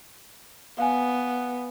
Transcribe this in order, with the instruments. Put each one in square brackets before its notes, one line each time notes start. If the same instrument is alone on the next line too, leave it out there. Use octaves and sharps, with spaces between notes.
[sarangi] B3 [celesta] F5 G#5